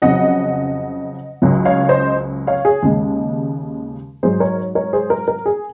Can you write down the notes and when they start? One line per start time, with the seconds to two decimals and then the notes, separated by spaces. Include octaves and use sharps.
0.02 F2 C#3 F#3 D#5 F#5
1.42 C#2 C#3 F#3
1.65 C#5 F5
1.89 C5 D#5
2.47 C#5 F5
2.65 G#4
2.83 D#2 C#3 G#3
4.23 G#2 F#3 G#4 C5
4.40 A#4 C#5
4.75 A#4 C#5
4.93 G#4 C5
5.10 A#4
5.28 A#4
5.46 G#4